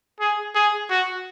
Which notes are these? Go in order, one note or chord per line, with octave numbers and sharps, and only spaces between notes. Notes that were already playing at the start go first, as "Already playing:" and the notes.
G#4
G#4
F#4